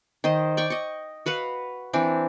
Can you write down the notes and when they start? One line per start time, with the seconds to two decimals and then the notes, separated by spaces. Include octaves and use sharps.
0.24 D#3 C5 D#5
0.57 D5 G5 C#6
0.70 D#5 C#6
1.26 F#4 B4 F5 F#5
1.93 E3 C4 D4